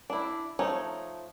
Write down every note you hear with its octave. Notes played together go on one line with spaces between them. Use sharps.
D4 E4
F3 A3 D#4 C#5